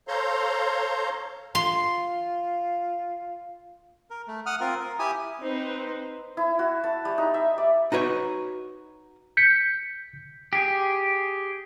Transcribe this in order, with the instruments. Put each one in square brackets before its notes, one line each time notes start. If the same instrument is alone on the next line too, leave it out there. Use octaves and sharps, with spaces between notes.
[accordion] A4 C5 C#5 F5 A#5 C6
[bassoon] F4 [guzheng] C6
[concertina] A#4
A3
F#5 D#6 F6
C4 F4 A#4
A#4
E4 G4 G#5 D#6
[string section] C4 B4 C5 [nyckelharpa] D#4
[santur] E4
F#4
A5
G3
D#4
E5
D5
[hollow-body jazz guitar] D#4 F#4 B4 C#5
[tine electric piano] G6 B6 C#7
[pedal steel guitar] G4 G#4